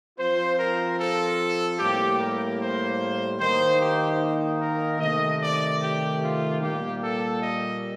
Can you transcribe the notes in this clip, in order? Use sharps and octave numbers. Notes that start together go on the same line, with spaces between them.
F3 C4 F4 C5
A#4
A4
A2 G3 A#3 G4
A#4
C5
D#3 A#3 D#4 C5
G4
A#4
C3 D#3 A3 D#5
D5
G4
F4
A#2 G3 A#3 G4
A4
D#5